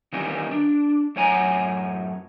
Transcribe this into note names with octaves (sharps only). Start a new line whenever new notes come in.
D#3 E3 G3 A#3 C#4
D4
F#2 A2 C#5 F#5 G#5 A#5